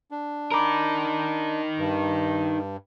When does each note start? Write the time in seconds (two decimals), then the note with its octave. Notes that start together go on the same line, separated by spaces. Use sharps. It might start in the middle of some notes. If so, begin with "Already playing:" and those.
0.11 D4
0.52 D#4 A#4 A#5 B5 D6
1.78 G2